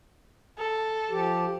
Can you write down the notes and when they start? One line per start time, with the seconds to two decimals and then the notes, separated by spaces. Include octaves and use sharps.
0.58 A4
1.11 F3 G4